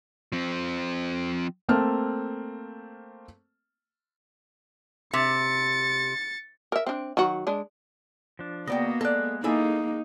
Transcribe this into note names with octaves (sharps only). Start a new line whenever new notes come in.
F3 C4
A3 A#3 C4 A5 F6
C3 A6 C#7
A#4 E5
C4 D4
D#3 F#3 F#4
G#3 D4
F3 D4
C#2 A#3 B3 F#4 D5 D#5 G5
G#3 A4 D5 F#6
G#3 A#3 D#4 E4 G#4 A4 G#5